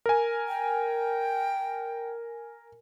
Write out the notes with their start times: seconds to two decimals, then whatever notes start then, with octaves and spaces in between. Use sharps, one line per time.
0.06 A#4 G#5
0.48 G5